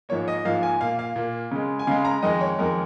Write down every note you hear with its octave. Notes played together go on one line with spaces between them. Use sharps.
G#2 F3 A#3 C#5
D#5
G#2 F3 A#3 F5
G#5
A#2 A#3 F5
F5
A#2 A#3
C#3 G#3
G#5
C#3 G#3 F5
A#5
F2 D#3 G#3 D#5
C#5
F2 D#3 G#3 A#4